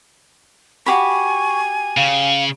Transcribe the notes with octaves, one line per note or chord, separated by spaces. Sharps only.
F#4 G4 G#5 B5 C#6
C#3 F5